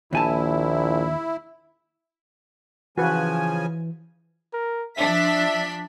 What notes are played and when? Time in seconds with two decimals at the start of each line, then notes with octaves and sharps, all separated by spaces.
0.13 A#1 D#2 E4 G#5 A5
2.98 C#3 E3 F3 F#4 B4 G#5
4.53 A#4
4.97 F3 D4 E5 B6